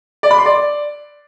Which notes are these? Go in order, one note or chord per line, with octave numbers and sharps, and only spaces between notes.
D5
B5
C6
D5